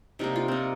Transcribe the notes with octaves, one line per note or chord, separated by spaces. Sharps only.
C3 G3 A#3 D#4
F4
C4 D#4